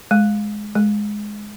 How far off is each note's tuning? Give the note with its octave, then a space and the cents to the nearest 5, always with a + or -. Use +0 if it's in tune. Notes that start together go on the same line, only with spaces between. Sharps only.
G#3 +10
G#3 +5